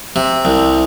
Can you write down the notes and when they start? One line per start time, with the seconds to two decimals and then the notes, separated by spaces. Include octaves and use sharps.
0.16 C3
0.45 C2